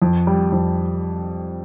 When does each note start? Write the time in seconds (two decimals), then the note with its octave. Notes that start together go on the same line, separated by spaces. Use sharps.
0.02 F2
0.27 G3
0.52 F2